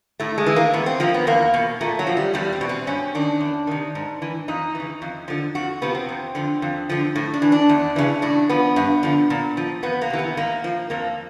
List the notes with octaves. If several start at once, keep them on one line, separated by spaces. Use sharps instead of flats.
A2 A3
G#3
E3
A#3
A2 B3
C4
F3 A#3
B3
E2 A#3
B2
A#2 A3
F#3
F3
G3
E2 G3
C4
B2
C4
G2 C#4
D#3 D4
E2
C3 D#3
G#2
E3
F2 D#4
C#3 E3
F2
D3 F3
F2 F#4
C3 F3 B3
C4
F2
D3 F3
F2
D3 F3
A2
D4
E3
D4
E2
C#3 E3
A2 D4
F3 B3
G2
D3 F3
A#2
F3
F2 B3
A#3
C3 E3
B3
G#2 A#3
F3
F2 A#3